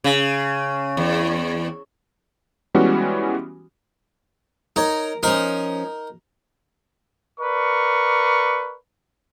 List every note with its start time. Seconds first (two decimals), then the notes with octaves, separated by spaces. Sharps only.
0.04 C#3
0.97 E2
2.75 E3 G3 G#3 B3 C#4 F#4
4.76 D#4 A#4 C#5
5.23 F3 C#4 D#4 A#4
7.40 A#4 B4 D5 C#6